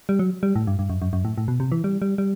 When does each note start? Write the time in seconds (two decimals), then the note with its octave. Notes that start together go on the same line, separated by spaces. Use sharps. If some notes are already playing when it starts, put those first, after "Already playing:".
0.09 G3
0.19 F#3
0.43 G3
0.56 A2
0.67 G2
0.79 G2
0.90 F#2
1.02 F#2
1.13 F#2
1.25 A2
1.38 A2
1.48 B2
1.60 C3
1.72 E3
1.84 G3
2.02 G3
2.18 G3